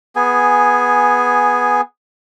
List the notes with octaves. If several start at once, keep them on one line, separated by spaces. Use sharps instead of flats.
B3 G#4 G#5